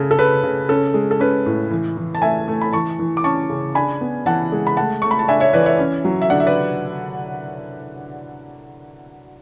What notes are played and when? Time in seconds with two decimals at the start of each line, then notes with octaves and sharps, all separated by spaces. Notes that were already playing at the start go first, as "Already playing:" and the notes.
Already playing: C#3 A3 A4 C#5
0.11 A4
0.18 C#3 B4
0.44 C#3
0.69 C#4 A4
0.94 G#3
1.11 A4
1.20 C#4 B4
1.46 A2
1.71 E3
1.97 E3
2.15 A5
2.22 A3 E5 G#5
2.48 A3
2.61 B5
2.73 E3 A5 C#6
2.99 E3
3.17 D6
3.24 C#4 A5 C#6
3.49 C#3
3.75 D4 G#5 B5
4.01 B3
4.26 E3 F#5 A5
4.52 G#3
4.67 B5
4.77 A3 F#5 A5
5.02 A3 C#6
5.11 B5
5.19 A5
5.28 D4 E5 G#5
5.40 C#5 E5
5.53 E3 B4 D5
5.66 C#5 E5
5.79 C#4
6.05 F#3
6.22 E5
6.30 D3 D5 F#5
6.40 E5
6.47 B4 D5